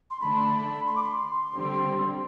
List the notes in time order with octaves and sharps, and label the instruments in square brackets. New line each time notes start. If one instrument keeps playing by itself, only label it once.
[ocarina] C6
[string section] D3 A3 D4 [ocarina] B5
[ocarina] C6
D6
C6
[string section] D3 G3 C4